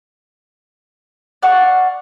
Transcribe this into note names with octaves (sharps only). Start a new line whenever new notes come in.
D5 F5 F#5 C#6